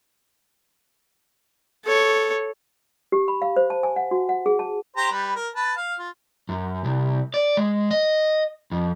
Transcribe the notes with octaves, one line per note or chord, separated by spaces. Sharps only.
A4 C#5
G4
B5
F5
C5
A5
G#5
F#5
F#4
F#5
G#4
A5
G4 C5 A#5
G3 B4
A#4
B4 A5
F5
F4
F#2
C2
D5
G#3
D#5
F2